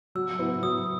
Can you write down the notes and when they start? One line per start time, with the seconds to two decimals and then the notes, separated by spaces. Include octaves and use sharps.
0.15 F#3 E6
0.39 B3 E4
0.62 F#3 D#6